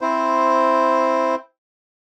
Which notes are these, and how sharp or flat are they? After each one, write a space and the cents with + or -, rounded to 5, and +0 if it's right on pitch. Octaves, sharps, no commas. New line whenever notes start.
C4 +0 E4 +0 C5 +0